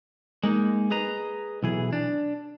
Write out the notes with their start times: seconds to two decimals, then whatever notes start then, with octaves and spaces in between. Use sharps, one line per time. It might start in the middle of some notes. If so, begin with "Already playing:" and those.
0.43 G#3 A#3 D#4
0.91 G#4 B4 D#5 A#5
1.63 B1 E3 G#4
1.93 D4